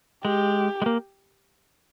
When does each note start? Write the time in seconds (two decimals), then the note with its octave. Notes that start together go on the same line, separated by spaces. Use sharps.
0.24 G#3 G4
0.82 G#3
0.86 A#3